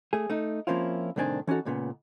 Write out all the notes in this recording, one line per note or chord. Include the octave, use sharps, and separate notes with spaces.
A3 G#4
A3 D#4
F3 A#3 C4 C#4 E4 F4
C2 A2 D#3 C4 D4 G#5
E3 C#4 D#4 F#4 A4
C#2 A#2 C#3 B3